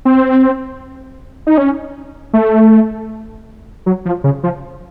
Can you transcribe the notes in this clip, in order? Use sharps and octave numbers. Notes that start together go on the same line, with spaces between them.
C4
D#4
C#4
A3
F#3
F3
C#3
F3